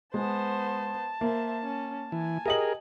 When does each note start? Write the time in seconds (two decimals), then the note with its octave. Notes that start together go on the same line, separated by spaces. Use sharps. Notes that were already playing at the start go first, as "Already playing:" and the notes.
0.14 G#3 B3 C5 A5
1.21 A#3 C5 E5
1.63 C#4
2.12 E3 G#5
2.46 G4 G#4 A#4 D#5 F#7